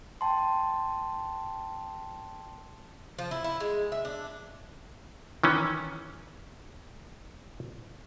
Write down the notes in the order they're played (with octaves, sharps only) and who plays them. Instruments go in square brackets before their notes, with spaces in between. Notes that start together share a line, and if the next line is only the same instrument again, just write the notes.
[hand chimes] G5 A5 C6
[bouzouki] F3
E4
E4
G#3
E5
D4
[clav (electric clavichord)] D#3 E3 C#4